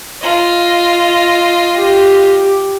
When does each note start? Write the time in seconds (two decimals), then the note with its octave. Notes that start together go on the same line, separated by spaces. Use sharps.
0.22 F4 D#5
1.77 G4